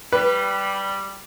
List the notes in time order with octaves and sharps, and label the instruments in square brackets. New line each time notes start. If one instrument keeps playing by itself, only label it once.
[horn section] G3 [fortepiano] B4